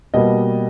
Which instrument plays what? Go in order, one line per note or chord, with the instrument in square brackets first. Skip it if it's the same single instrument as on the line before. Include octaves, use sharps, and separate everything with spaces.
[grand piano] B2 G3 A#3 D#5